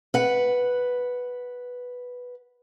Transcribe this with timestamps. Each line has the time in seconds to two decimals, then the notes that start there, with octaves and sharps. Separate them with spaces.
0.14 B4 F#5